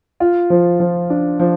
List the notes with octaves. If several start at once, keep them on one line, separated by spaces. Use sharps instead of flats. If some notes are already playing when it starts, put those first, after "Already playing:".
F4
F3
F3
D4
F3